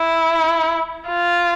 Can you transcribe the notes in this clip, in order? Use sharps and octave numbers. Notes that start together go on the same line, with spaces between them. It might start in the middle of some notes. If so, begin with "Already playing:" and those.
Already playing: E4
F4